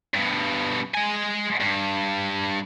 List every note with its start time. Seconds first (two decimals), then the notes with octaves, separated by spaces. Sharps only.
0.14 G2 B2
0.94 G#3 G#5
1.60 G2